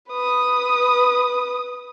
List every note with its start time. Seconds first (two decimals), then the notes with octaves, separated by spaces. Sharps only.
0.10 B4 D#6